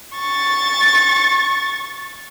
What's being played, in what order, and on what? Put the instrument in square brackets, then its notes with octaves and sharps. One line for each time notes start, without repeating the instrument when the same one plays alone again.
[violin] C#6 A6